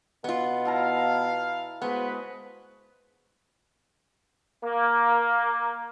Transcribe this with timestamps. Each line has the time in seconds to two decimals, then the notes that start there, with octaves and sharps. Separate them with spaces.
0.24 B2 B3 F4
0.65 E4 F5 A5 A#5
1.82 G#3 B3 F#4 B4 C5
4.62 A#3